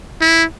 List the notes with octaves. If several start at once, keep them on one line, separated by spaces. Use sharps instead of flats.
E4